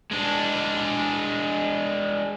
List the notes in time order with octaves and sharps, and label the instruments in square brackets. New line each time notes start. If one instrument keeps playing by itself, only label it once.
[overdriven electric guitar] G#3 D4